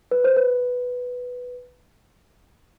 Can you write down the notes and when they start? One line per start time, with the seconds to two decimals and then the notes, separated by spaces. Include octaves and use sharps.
0.11 B4
0.24 C5
0.37 B4